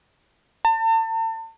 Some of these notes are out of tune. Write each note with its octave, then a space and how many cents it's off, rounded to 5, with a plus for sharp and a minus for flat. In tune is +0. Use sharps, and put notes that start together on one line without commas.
A5 +40